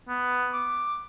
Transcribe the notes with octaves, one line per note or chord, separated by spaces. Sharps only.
B3
D6